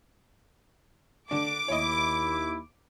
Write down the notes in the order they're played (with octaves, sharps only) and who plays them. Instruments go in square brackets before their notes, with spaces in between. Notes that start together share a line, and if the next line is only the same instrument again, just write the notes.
[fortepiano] D3 D4 [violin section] D6
[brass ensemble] D#2 E4 [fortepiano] C#5 D#5